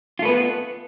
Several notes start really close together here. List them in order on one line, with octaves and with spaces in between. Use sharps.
F4 A3 B4 B3